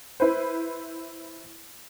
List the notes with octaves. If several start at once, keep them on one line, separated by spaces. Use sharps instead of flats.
E4 B4 C5